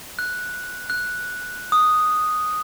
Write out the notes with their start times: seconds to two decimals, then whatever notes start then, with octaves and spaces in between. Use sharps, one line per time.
0.19 F#6
0.90 F#6
1.72 D#6